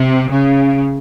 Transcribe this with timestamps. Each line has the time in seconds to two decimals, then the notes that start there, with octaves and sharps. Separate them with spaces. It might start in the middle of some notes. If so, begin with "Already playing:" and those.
Already playing: C3
0.30 C#3